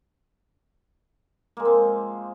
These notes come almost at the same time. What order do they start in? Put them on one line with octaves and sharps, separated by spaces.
A#3 G#3 F3 C4